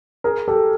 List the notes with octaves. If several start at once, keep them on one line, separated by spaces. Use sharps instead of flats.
G#4 A#4
G4 A4